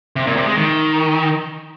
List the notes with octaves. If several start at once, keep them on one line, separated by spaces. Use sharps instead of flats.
C3
A#2
C3
G#3
D#3